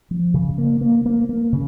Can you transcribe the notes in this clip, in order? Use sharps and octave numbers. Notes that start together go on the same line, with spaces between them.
F3
C#3
A#3
A#3
A#3
A#3
C#3